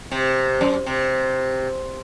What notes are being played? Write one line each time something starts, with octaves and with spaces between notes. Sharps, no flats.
C3
F#2
C3